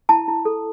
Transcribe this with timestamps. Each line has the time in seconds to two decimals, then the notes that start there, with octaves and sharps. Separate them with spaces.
0.09 E4 A5
0.28 E4
0.45 A4